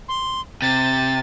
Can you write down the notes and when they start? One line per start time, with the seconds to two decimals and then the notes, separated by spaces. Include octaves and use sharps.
0.08 C6
0.62 C3 A6